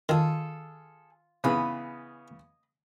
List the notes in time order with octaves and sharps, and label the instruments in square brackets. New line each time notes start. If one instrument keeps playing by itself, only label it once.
[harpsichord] D#3 [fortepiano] F4 [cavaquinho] G#4 A4
[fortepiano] C#3 E3 B3 [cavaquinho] D#5 B5 D#6